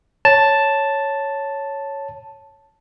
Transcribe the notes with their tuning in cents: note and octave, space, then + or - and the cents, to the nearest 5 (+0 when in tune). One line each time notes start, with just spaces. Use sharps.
C#5 +0 A5 +0